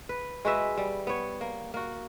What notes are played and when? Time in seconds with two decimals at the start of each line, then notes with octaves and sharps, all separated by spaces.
0.09 B4
0.45 G#3 F#4 B4 E5
0.78 G3
1.07 B3 C#5
1.41 A#3
1.74 A#3 F#4